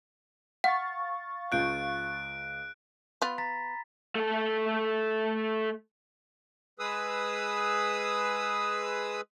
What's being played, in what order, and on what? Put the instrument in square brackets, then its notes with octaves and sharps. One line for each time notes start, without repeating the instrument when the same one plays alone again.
[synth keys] F5 C#6 A6 [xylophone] F#5
[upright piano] C#2 F4 G6 [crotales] F#6 D7
[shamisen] B3 F4 [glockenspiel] B5
[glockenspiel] A#5 A6 B6
[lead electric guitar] A3 A4
[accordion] G#3 G#4 B4 D#6 E6